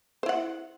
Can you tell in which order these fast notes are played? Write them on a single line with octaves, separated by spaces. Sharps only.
C5 E4 F#5